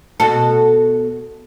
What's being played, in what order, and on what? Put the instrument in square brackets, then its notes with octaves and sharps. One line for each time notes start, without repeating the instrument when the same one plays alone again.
[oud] B2 F#4 A4